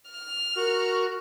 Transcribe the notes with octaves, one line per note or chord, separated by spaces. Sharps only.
F6
F#4 A#4